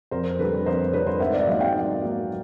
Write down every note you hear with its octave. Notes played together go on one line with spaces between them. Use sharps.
F2 A#4 C5
D3 G3 A4 B4
F2 A#4 C5
D3 G3 B4 C#5
A#4 C5
G#2 E5 F#5
D5 E5
D#3 F#3 A#3 D#5 F5
F5 G5
G#2
D#3 F#3 A#3